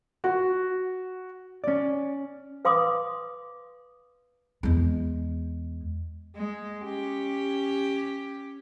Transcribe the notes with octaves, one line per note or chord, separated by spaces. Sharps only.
F#4
C#4 D5
B4 F5 C6 D6 D#6
E2 G#3
G#3
C#4 G4